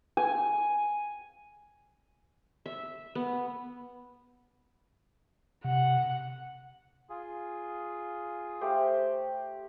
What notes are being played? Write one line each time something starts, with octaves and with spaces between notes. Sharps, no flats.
G#5
E5
B3
C3 F#5
F4 G#4
A3 G4 C5